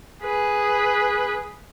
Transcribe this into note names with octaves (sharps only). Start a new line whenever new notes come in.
G#4 B4